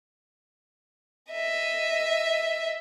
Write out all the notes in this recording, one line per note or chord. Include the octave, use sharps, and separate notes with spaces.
D#5 E5